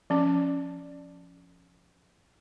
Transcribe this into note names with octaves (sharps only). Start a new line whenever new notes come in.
F3 C#4